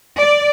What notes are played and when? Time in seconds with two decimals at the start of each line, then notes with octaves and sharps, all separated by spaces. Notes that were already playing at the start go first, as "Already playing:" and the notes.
0.19 D5